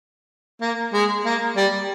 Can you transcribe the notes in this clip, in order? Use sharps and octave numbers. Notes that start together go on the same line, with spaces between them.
A#3
G#3
A#3
G3